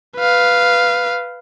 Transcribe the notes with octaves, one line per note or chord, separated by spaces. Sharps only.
B4 F5